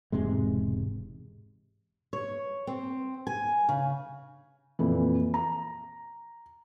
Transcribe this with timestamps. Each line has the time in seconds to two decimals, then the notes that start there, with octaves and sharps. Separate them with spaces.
0.12 E1 G#2 C3 G#3
2.13 C#5
2.67 C4
3.27 G#5
3.69 C#3
4.79 F2 A#2 E3
5.34 A#5